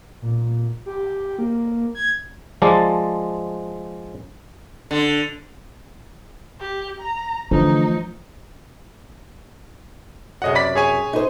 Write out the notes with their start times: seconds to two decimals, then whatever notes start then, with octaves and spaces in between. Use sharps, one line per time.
0.22 A#2
0.86 G4
1.39 A#3
1.95 G#6
2.62 F3 G#3 D5 A5
4.91 D3
6.60 G4
7.00 A#5
7.51 D3 E3 F3 A3 D#4
10.42 F#2 C3 G#4 D#5 F#5
10.55 D5 B5 B6
10.75 G#4 C#5 G#5
11.13 D#4 C5